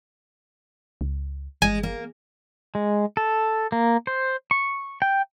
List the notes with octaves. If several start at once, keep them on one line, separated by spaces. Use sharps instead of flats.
C#2
G1 G#3 G#5
A#3
G#3
A4
A#3
C5
C#6
G5